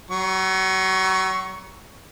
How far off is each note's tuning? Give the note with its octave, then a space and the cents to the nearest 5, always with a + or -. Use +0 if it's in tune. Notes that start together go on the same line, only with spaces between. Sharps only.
F#3 +40 C#6 +0